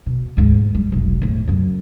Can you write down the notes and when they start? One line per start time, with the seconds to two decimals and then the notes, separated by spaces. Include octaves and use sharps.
0.06 B2
0.37 D2 G#2
0.75 G3
0.92 F1 B1
1.22 E2 A2
1.47 F#2 C#3